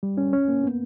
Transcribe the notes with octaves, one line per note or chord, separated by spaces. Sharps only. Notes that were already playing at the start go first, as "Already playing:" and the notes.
G3
C#4
C#4
A#3
B3